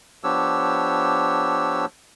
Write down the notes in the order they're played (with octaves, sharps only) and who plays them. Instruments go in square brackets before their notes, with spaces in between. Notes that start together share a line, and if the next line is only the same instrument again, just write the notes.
[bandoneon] F3 B3 D4 G4 C#5 E6